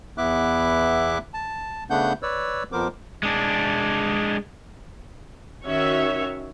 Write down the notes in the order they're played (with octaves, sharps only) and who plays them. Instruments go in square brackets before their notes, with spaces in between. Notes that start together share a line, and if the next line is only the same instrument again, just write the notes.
[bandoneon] E2 B3 E4 E5 D6 F#6
A5
C#3 A3 B3 D4 F#5 G6
B4 C#5 D5 E6
F2 F3 B3 A#4 C5 D6
[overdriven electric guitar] G#3 D4
[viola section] D#3 C#4 F#4 C#5 E5